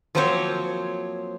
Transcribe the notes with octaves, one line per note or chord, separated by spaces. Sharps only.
F3 F#3 A#3 C4 C5 C#5